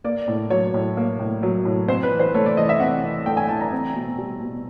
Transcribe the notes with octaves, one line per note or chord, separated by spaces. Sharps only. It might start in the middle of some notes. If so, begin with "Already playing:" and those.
A#3 D5
A2
F#3 C#5
A2
A#3
A2
F#3
A2
C4 C5
B4
E3
C5
A3 C#5
D5
E3 D#5
E5
C4 F#5
E3
A3 G5
G#5
E3 A5
A#5
C4
B2
G3
B2